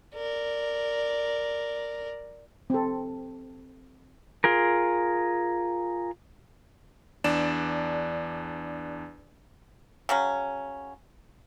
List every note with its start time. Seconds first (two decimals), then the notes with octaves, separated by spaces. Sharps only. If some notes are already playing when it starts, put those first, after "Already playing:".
0.15 A#4 D5
2.70 C4 A4
4.44 F4 G#4 A#4
7.24 E2 D4 D5 E7
10.09 C#3 F#3 C#4